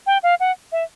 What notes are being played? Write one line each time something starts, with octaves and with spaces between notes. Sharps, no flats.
G5
F5
F#5
E5